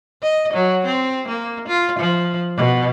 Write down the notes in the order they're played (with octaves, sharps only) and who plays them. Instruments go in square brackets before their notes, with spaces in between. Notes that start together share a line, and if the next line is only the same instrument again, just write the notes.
[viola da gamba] D#5
F#3
C4
A#3
F4
F3
B2